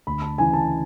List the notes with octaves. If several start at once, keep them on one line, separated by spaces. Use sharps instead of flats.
D2 B5
A5
C#3 E3 G#5
A5